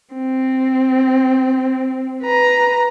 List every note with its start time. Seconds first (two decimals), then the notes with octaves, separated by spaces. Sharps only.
0.14 C4
2.23 B4 A#5